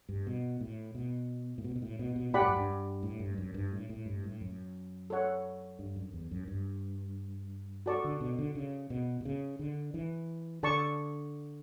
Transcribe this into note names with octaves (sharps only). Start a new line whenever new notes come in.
G2
B2
A2
B2
A2
B2
B2
A2
B2
B2
A2 G4 D5 F#5 B5
G2
F#2
G2
A2
G2
F#2
G2
A2
A2
G2
A2
F#2
A4 C#5 F#5
G2
F#2
E2
F#2
G2
F#4 A4 D5 A5 C#6
D3
B2
D3
C#3
B2
B2
C#3
D3
E3
D3 A4 D5 A5 C#6